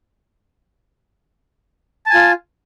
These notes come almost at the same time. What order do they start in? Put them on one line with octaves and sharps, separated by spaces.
A5 G#5 F4